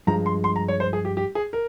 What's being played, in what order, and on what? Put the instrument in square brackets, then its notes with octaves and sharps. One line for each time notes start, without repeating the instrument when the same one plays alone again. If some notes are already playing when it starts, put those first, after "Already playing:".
[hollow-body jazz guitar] G2 F3 G#3 [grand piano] A#5
[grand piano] C6
C6
A#5
C#5
C5
G#4
G4
G4
G#4
A#4